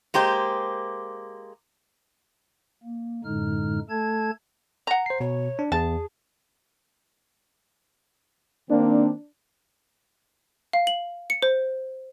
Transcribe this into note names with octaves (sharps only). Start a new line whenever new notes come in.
G#3 A#3 G4 C5
A#3
F#2 A2 D3 G#3 D#4 F6
A3 A4 A5 G#6
F#5 A#5
C5 C7
B2 C#5
D4
E2 G#4 A5
D#3 A#3 C4 D4
F5
F#7
C#7
C5